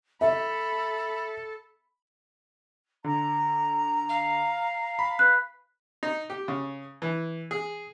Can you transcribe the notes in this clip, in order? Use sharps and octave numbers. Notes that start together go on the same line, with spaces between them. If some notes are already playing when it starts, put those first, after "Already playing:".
A4 E5 B5
D3 A#5
F5
B5
B4 F#6
D#4
G4
C#3
E3
G#4